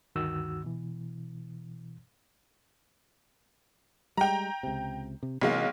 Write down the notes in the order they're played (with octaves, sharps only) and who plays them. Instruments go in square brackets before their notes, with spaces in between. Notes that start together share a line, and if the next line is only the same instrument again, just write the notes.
[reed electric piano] D2 G2 D#3 F#4 E6
B2 E3
[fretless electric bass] G3 G#3 [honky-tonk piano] G5 A#5
[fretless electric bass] C#2 C3
C3
[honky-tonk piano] B1 G#3 F5 [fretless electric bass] C3 E3 A#3